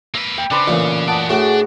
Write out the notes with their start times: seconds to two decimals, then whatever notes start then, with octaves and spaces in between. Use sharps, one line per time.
0.14 A#3 B4 E6
0.38 G5
0.51 C#3 D4 B4 C5
0.68 A1 A#2 G#5
1.08 B4 D5 F#5 A5 D#6
1.30 A2 D4 F#4 G#4 F#5